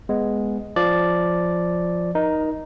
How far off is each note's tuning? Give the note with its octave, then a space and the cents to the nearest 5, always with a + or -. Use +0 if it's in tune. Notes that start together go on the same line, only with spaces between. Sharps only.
G#3 +0 B3 +0
F3 +0 D5 +0
D#4 +0 A#4 +25